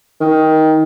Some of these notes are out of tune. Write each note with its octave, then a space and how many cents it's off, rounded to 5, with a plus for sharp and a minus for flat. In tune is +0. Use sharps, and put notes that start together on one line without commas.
D#3 +15